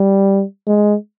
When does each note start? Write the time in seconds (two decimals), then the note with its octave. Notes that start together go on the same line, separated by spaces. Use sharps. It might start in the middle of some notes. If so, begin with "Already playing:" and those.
Already playing: G3
0.67 G#3